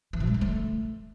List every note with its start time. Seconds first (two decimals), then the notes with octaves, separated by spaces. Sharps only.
0.13 E3
0.20 B2
0.27 G#3
0.34 D3
0.41 A3